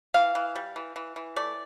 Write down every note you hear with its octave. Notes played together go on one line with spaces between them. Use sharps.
E3 F5
E3
G3
E3
E3
E3
A3 D5